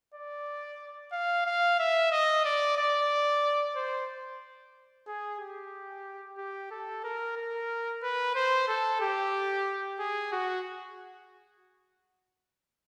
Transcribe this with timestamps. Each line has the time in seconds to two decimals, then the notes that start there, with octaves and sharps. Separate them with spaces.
0.14 D5
1.12 F5
1.46 F5
1.79 E5
2.11 D#5
2.45 D5
2.77 D5
3.75 C5
5.07 G#4
5.40 G4
6.38 G4
6.71 A4
7.04 A#4
7.36 A#4
8.03 B4
8.35 C5
8.68 A4
9.01 G4
9.99 G#4
10.32 F#4